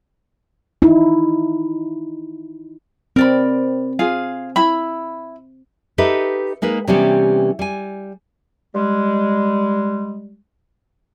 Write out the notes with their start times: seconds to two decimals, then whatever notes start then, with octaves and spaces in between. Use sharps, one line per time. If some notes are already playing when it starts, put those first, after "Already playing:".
0.82 D#4 E4
3.16 C4 A#4 D5 B5
3.99 F4 G#4 F5
4.56 E4 E5 B5
5.98 D#4 G4 A4 B4 D#5 E5
6.62 G#3 A#3 D#4 B4
6.87 C3 E3 G3 B3 C#4 G4
7.59 G3 G#5
8.75 G3 G#3